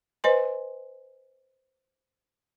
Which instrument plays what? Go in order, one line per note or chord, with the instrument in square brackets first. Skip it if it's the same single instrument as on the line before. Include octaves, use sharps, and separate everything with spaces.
[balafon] B4 C5 D#5 G#5 C6